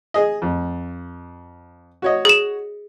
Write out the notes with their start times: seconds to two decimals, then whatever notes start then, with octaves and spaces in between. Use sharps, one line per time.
0.14 G#4 D#5
0.42 F2
2.02 F#4 C#5 D#5
2.25 G#4 E7